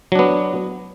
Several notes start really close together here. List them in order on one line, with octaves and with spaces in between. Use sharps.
F#3 D4 B3